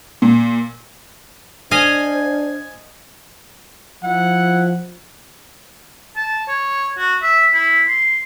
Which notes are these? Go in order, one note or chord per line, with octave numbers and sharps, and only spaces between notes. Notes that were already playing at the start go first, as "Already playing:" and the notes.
A#2
D4 C5 D#5 F5 G#5
F3 E4 F#5
A5
C#5
F#4
E5
E4
C6